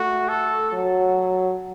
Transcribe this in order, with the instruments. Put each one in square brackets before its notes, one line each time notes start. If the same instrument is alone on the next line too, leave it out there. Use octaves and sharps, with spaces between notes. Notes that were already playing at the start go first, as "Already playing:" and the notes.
Already playing: [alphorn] A3 [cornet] F#4
[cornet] A4
[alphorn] F#3